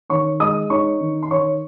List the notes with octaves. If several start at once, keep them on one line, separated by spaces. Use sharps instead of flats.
D#3 C#5 C#6
G#3 D#5 D#6
D#4 C#5 C#6
D#3
C6
D#3 C#5 C#6